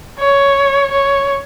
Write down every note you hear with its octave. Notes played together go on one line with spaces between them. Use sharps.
C#5
C#5